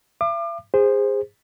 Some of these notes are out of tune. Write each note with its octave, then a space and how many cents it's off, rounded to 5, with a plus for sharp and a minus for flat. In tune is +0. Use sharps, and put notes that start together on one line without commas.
E5 +45 D6 +35
G#4 -25 C5 +0